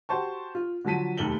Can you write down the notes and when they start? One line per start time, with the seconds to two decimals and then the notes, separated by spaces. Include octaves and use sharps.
0.09 F#4 G4 C5 A5 C#6
0.55 F4
0.84 D3 F3 F#3 A5 B6 D#7
1.17 F1 D#2 A#3 A4 F#7 G7